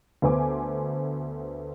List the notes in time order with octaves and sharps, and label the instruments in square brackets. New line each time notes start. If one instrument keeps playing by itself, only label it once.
[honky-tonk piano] D2 B3 C5 G#5 D6